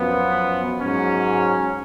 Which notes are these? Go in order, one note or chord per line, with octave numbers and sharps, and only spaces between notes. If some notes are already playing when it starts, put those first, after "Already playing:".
Already playing: F#2 F3 B3
G#2 F#3 C#4